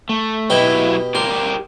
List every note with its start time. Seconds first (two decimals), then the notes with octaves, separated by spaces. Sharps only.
0.09 A3
0.50 B2 F#3 E4 G4 D#5
1.15 G4 A#4 D5 C6